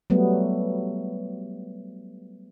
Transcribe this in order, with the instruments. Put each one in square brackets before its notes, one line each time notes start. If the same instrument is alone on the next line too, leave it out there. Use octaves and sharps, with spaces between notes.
[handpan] F#3 G3 A3 B3